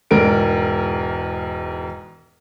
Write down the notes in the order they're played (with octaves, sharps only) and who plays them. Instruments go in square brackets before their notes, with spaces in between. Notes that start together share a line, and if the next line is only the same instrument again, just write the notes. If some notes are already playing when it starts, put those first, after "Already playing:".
[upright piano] E1 G#2 A#4 D7